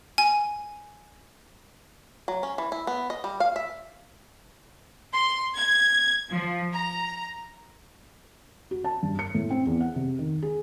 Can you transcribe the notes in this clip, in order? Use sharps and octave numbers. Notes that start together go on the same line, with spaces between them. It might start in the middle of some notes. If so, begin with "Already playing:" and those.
G#5
F#3
C#4
E3
E4
B3
D#5
G3
F5
E5
C6
G#6
F3
A#5
F#4
A5
G2
C#7
A2
C4
E2
F#5
C3
D#3
G#4